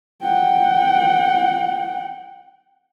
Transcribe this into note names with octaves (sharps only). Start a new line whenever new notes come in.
F#5 G5